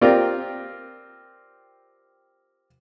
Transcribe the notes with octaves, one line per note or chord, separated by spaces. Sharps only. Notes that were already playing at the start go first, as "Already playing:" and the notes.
C4 F4 G4 A#4 D5